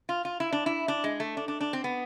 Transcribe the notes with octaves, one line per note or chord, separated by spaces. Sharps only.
F4
F4
E4
D4
E4
D4
G#3
A3
D4
D4
D4
C4
B3